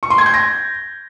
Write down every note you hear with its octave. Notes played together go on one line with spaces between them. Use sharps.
C#6
C6
G#6
G6
A#6